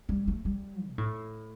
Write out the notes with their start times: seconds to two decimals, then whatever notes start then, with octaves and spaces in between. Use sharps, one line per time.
0.09 G3
0.28 A3
0.45 G3
0.88 B2
0.98 A2